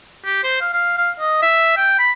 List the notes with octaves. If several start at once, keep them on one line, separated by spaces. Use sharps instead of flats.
G4
C5
F5
F5
F5
D#5
E5
G5
B5